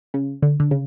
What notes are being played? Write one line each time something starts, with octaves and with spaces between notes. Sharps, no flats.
C#3
D3
D3
C#3